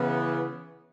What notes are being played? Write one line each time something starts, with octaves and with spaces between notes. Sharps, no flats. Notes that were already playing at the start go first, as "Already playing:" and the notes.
Already playing: C#3 E3 B3